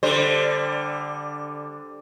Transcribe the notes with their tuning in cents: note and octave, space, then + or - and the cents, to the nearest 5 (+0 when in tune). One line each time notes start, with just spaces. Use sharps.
D3 +0 G3 +15 C5 +0